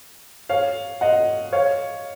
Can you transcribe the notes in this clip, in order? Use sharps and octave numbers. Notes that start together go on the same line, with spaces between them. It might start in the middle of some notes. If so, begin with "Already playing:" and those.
C#5 F5
D#5 F#5
C#5 F5